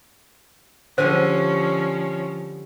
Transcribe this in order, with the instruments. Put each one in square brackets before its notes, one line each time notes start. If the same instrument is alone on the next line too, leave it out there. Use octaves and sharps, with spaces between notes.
[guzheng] D3 G3 G#5 [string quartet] F3 C#4 [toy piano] C5